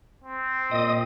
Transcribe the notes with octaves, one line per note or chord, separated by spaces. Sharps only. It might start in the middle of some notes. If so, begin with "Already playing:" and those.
C4
A#2 D#5 D#6